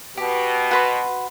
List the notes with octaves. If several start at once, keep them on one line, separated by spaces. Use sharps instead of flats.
B2 G4
F#4 B4 C6